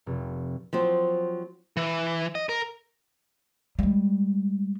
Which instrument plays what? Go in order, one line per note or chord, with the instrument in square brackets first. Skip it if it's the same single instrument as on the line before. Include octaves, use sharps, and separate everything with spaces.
[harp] F1
[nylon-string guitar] F3 F#3 C4
[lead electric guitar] E3
D#5
A#4
[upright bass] G3 G#3